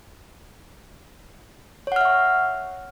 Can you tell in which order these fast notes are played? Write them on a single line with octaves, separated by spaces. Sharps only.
C#5 F#5 F6 E5 C#6